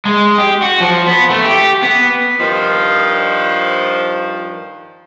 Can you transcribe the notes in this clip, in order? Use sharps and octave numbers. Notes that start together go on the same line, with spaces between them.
G#3
G4
F#4
F3
B3
A3
G4
B3
G2 D#3 F3